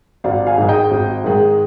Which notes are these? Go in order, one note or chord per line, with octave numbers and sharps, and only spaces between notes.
G#1 D5 F5
F5 G#5
G#2 D#3 G#3
D#5 G5
G#1
G#2 D#3 G#3